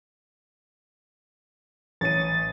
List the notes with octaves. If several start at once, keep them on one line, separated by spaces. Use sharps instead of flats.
A1 C#5 A6 D#7